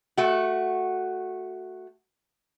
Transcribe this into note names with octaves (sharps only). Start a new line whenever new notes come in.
A3 F#4